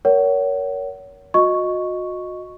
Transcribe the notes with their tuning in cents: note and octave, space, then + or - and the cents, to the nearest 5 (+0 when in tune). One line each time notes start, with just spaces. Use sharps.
A#4 +0 C#5 +20 F#5 +25
F#4 -35 D#5 +0 C#6 +0